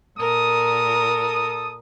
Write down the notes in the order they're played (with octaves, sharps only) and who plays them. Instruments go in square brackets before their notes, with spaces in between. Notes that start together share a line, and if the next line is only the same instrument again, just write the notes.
[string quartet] A#2 A#4 [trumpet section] A4 D#6